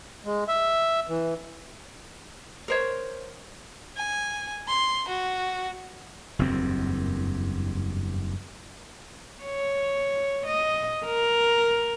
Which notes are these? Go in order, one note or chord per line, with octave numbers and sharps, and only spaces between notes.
G#3
E5
E3
A#4 C5 C#5
G#5
C6
F#4
F#1 E2 G2 C4
C#5
D#5
A#4